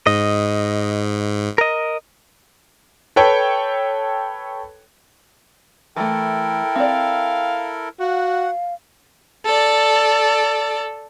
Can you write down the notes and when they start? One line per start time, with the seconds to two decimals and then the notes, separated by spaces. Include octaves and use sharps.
0.07 G#2 D#5
1.58 A#4 D#5
3.16 A4 B4 C#5 G5
5.96 E3 A3 E4 A4 A#4 G5
6.76 C4 D5 F5
8.00 F#4 F5 F#5
9.45 A4 D5